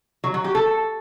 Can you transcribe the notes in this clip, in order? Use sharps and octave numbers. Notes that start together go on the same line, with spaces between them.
F#3
F#3
G4
A4